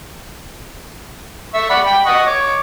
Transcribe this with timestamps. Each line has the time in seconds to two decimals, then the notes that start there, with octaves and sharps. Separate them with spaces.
1.54 E5 C#6
1.70 D5 F#5 B5
1.86 G5 B5
2.06 D#5 F#5 C#6
2.27 C#5 D6